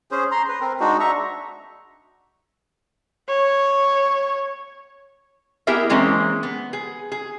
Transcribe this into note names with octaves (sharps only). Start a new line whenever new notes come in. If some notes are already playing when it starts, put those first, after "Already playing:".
C#4 G#4 C5
A#5 C6
B4
C4 A#4
G#3 D4 D#4 F#4
E5 A#5 C#6
C#5
B3 E4 G4 G#4 A#4 E5
E3 G#3 A#3 C4 C#4
B3
G#4
G#4